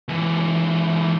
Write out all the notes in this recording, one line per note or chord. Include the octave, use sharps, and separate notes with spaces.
C#2 E3